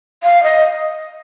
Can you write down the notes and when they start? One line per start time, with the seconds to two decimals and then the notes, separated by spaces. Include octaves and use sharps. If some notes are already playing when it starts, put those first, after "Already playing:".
0.23 F5
0.43 D#5